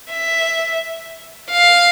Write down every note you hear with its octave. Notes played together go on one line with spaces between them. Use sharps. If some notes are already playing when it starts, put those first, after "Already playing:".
E5
F5